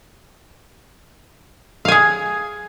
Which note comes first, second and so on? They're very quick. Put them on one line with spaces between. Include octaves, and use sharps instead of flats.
F5 G#5 G#4